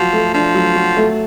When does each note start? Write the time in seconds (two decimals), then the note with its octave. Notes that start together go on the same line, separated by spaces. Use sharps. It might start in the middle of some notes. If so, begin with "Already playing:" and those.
Already playing: F3 F#3 F#4
0.13 A3
0.34 F3 D4
0.55 F#3
0.76 F#4
0.97 A3